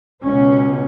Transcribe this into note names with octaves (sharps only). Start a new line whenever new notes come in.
C#2 B2 C#4